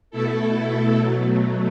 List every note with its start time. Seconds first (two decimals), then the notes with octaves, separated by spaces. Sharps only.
0.11 B2 A3 E4 A4
0.98 B2 F#3 A3